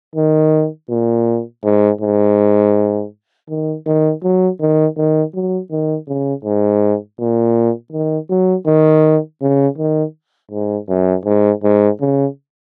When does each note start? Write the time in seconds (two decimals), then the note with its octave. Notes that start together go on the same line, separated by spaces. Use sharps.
0.16 D#3
0.90 A#2
1.64 G#2
2.01 G#2
3.50 D#3
3.86 D#3
4.24 F#3
4.61 D#3
4.97 D#3
5.34 F#3
5.71 D#3
6.08 C#3
6.45 G#2
7.20 A#2
7.93 D#3
8.30 F#3
8.67 D#3
9.42 C#3
9.78 D#3
10.52 G#2
10.90 F#2
11.26 G#2
11.63 G#2
12.01 C#3